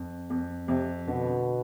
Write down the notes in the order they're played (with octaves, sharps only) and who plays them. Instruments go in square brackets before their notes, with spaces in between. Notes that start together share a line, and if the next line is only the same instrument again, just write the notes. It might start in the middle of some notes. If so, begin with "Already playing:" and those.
Already playing: [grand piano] F2
F2
[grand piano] F2 [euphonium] C3
[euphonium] B2 [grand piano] D3